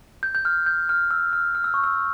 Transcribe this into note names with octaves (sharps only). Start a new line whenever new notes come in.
G6
G6
F6
G6
F6
E6
F6
F6
E6
C#6
E6